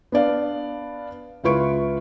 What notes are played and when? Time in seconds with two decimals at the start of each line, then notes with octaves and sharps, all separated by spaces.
0.12 B3 D4 D5 F5
1.44 C#2 E4 F4 B4 C#6 D7